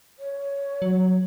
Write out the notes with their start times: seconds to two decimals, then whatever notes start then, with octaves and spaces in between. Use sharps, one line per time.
0.19 C#5
0.82 F#3